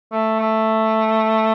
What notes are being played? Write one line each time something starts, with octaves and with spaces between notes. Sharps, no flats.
A3
A3